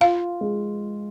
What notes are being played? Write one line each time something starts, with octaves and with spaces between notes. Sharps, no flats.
F4 F5
G#3